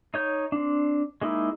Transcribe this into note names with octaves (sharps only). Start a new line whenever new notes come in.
D#4 C#5 G6
C4 D4
G#3 A#3 D#4 E4